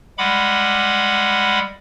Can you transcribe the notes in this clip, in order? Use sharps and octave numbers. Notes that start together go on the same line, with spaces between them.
G3 G#3 F#5 B5 D6